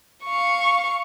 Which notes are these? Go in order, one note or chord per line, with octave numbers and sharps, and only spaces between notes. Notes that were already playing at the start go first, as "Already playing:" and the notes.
F5 C#6